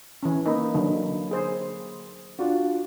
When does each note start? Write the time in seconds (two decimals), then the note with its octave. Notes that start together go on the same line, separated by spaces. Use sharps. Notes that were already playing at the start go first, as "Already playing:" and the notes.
0.23 E3 C#4
0.46 A#3 D#4 B5
0.74 D3 F#3
1.31 G#4 C5
2.39 D4 F4 F#4